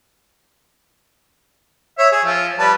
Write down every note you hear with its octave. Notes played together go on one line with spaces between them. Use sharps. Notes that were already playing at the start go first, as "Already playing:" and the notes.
C#5 E5
G#4
F3
G3 B4 A5